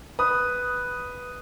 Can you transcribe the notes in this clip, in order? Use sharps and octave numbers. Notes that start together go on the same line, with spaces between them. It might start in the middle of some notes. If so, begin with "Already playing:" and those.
B4 D#6